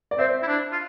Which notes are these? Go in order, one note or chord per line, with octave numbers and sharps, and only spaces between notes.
D5
C4 C5 E5
E4
D4
F4